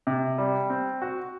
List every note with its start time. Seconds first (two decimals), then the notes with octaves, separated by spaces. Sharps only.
0.07 C3
0.38 G3
0.70 C4
1.02 F#4